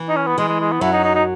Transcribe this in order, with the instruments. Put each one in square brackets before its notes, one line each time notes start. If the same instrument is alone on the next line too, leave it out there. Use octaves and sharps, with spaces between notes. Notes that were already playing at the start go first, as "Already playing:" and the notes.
Already playing: [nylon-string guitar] E3
[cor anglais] D#4
C#4
B3
[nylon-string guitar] E3 [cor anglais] G#3
[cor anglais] G#3
G#3
B3
[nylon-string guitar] F#2 F#3 [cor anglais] E4
[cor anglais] D#4
D#4
D#4